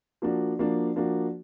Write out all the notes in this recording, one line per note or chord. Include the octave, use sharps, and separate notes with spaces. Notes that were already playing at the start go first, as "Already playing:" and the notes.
F3 A#3 D4 F#4
F3 A#3 D4 F#4
F3 A#3 D4 F#4